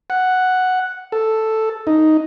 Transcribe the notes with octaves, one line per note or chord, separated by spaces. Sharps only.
F#5
A4
D#4